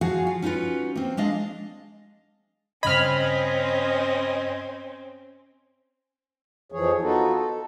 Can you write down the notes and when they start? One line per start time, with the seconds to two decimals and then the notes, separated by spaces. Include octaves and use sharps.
0.01 F3 F#4 G#4 F5 F#5 G#5
0.27 F4
0.42 C#4 D#4 F4 F#4 B4
0.95 A#3 C4
1.17 G#3 D4 D#5 F5
2.83 G2 C#3 C4 C#4 D#5 B5 F6 G#6
6.72 F2 E3 F3 G#4 C#5
7.01 B3 D#4 F4 F#4 A4
7.34 A4